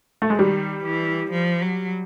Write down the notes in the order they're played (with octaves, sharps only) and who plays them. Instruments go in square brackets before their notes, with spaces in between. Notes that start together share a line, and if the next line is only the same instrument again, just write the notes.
[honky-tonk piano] A3
G#3
[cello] D#3 [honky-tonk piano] G3
[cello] E3
F3
F#3